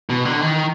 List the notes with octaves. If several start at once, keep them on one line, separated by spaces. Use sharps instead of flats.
B2
D3
D#3